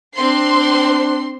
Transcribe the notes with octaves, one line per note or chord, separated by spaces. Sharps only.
C4 D4 C5 C6